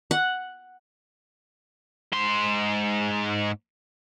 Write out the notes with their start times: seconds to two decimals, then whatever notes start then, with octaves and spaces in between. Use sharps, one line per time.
0.11 F#5
2.13 G#2 C6